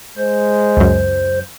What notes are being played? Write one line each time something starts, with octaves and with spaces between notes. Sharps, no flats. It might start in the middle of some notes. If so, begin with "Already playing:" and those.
G#3 C5
C#2 F#2